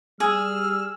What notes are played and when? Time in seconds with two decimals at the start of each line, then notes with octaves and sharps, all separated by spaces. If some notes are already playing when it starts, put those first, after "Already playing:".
0.20 G3 G#4 E6 F6